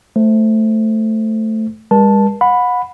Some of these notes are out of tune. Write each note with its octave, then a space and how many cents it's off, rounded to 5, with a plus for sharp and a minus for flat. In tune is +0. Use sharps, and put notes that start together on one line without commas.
A3 +0 C5 +0
G#3 -45 A#4 +45 A5 +0
F#5 -30 B5 +5